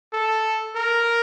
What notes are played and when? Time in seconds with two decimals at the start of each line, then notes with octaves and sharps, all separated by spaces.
0.13 A4
0.76 A#4